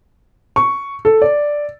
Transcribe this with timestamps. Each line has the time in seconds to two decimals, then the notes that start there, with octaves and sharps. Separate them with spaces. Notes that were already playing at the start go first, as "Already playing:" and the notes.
0.56 C#6
1.05 A4
1.22 D5